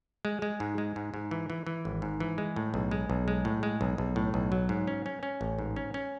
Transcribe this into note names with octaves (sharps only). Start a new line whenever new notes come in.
G#3
G#3
G#2
G#3
G#2
G#2
E3
E3
E3
G#1
G#2
E3
G#3
A2
B1
G#3
B1
G#3
A2
G#3
B1
B1
A2
B1
F#3
G#2
C#4
C#4
C#4
A1
G#2
C#4
C#4